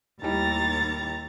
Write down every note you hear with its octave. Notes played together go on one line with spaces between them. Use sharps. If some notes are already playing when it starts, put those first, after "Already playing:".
D#2 A2 D#3 G3 A#5 A6